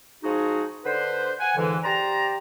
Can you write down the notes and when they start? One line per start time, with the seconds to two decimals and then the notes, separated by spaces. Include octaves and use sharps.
0.24 F3 G#3 D#4 F#4 G#4
0.84 D3 B4 C5
1.40 F#5 G#5
1.57 F2 G#2 D3 E3
1.83 G4 C5 D5 A#5